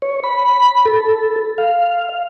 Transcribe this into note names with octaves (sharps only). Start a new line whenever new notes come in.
C#5
B5
A4
F5